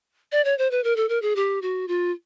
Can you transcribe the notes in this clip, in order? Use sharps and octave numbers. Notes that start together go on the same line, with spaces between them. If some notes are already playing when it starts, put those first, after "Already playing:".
D5
C#5
C5
B4
A#4
A4
A#4
G#4
G4
F#4
F4